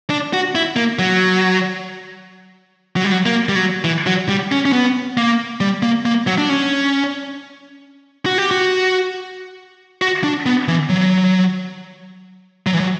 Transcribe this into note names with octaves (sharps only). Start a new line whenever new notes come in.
D4
F#4
E4
A#3
F#3
F#3
G3
F#3
A#3
G3
F#3
E3
F#3
G3
C#4
C#4
B3
A#3
G3
A#3
A#3
F#3
D4
C#4
F#4
G4
F#4
F#4
D4
B3
E3
F#3
F#3
E3
F#3